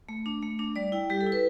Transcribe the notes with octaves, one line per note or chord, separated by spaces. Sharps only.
A3
D4
A3
D4
G3 D5
E4 G5
G3 G4
A4
E4
B4